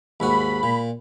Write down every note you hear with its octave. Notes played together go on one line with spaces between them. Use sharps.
D#2 G#2 F#4 B5
A#2